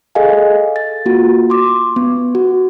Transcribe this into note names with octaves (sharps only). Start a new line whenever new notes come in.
G#4 A4 D#5 F5 G#5
A6
A#3 F4 F#4
C6 D6
B3
F#4